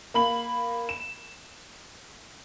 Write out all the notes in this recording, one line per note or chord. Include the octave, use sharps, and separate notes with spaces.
A#3 B5 F#7
E7